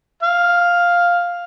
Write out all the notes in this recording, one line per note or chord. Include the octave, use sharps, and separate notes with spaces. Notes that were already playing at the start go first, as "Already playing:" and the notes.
F5